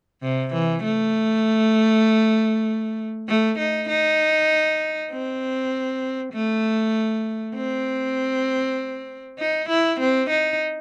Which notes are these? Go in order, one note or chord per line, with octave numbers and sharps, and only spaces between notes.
C3
E3
A3
A3
D#4
D#4
C4
A3
C4
D#4
E4
C4
D#4